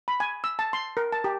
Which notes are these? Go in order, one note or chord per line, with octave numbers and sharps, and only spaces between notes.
B5
G#5
E6
A5
C6
A#4
A5
G4